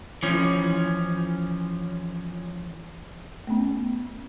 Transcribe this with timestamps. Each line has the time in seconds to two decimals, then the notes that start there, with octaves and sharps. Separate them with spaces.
0.23 E3 F3 C#4
3.47 A3 B3 C#4